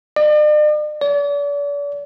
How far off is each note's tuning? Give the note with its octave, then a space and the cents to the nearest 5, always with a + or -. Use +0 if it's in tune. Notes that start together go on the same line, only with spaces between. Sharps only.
D5 +45
D5 -40